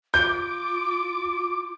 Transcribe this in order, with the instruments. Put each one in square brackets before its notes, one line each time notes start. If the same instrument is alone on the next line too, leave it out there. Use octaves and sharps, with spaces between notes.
[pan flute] F4 [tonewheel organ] D6 [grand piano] G6